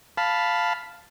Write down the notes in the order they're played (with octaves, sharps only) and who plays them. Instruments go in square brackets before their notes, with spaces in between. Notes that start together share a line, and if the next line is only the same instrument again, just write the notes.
[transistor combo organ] F5 A5 B5